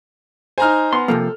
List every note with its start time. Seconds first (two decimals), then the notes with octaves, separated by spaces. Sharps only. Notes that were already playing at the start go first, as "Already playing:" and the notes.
0.58 D#4 C5 G#5 A#5 F6
0.93 B3 C6
1.08 C3 F3 A#3 A4